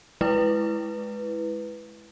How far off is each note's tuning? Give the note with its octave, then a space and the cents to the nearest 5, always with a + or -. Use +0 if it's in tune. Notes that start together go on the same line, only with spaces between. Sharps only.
G#3 +25 E4 +0 B4 +0